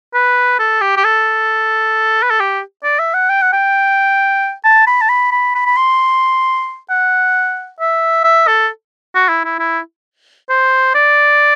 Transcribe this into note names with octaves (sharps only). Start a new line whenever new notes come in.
B4
A4
G4
G4
A4
B4
A4
G4
D5
E5
F#5
G5
F#5
G5
A5
B5
A5
B5
B5
B5
B5
C6
F#5
E5
E5
A4
F#4
E4
E4
E4
C5
D5